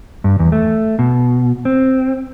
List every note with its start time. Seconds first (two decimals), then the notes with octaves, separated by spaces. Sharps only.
0.24 G2
0.39 E2
0.52 A3
0.99 B2
1.65 C4